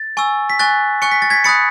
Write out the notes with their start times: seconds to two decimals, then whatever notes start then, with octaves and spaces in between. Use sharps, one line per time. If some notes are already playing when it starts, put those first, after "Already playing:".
Already playing: A6
0.17 G#5 C#6 E6
0.50 B6
0.59 G#5 C#6 F#6 A6
1.02 G#5 C#6 F#6 C#7
1.11 B6
1.22 A6
1.30 G#6 B6
1.44 B5 D#6 F#6 A6 C#7